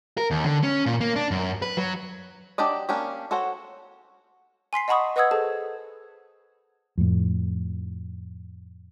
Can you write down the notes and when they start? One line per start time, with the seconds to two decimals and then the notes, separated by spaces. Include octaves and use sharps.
0.18 A#4
0.31 D#2
0.44 D3
0.63 C#4
0.86 A#2
1.01 A#3
1.16 D4
1.31 F#2
1.62 B4
1.77 F#3
2.58 F#3 D4 G4 D5 D#5
2.89 A#3 C#4 D4 G4
3.31 F#4 A4 C5 C#5 F#5
4.73 G#5 C6 B6 C7
4.88 D#5 F#5 A5 B5 C#6 D#6
5.16 B4 D#5 F#5 D#6 E6 G#6
5.31 G#4 A4 C5 A5
6.98 F2 A2